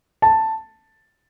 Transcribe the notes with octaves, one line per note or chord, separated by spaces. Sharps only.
A5